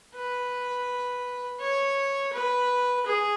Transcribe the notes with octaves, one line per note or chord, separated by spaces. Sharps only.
B4
C#5
B4
G#4